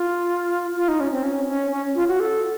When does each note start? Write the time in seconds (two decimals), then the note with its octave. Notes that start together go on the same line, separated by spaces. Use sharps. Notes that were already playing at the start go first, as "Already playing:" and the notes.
Already playing: F4
0.76 F4
0.88 D#4
1.00 C#4
1.12 C4
1.23 C#4
1.48 C#4
1.71 C#4
1.95 F4
2.08 F#4
2.20 A4